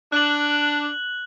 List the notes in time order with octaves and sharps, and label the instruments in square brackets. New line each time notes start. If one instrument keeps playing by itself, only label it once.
[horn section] D4 [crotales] F#6 F#7